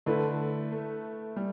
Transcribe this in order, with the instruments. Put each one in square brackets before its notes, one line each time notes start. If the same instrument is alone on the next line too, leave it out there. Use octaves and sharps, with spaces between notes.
[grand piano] D3 [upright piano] A3 E4 B4
[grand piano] A3
G3